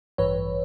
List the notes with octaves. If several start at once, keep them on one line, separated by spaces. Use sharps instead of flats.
A1 G2 E3 B4 C#5